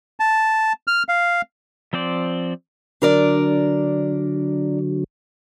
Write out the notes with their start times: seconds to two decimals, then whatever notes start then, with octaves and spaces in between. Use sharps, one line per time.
0.20 A5
0.87 F6
1.09 F5
1.93 F3 C4 C5 D5
3.02 D3 F#3 D4 A#4 D5